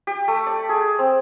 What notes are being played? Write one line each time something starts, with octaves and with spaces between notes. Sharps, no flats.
G4
A3
D5
G#4
C4